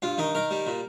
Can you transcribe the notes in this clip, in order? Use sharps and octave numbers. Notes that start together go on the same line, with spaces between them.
G2 F4
D#3 D#4
D#3 A#4
G3
A#2